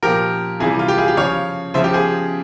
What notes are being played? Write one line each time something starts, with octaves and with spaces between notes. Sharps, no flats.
A#2 F3 G4 A#4
C3 E3 G3 F4 G#4
F4
G4
F4 G#4
G4
C#3 F3 C#5 F5
C#3 F3 C5 E5
G4
G#4 C5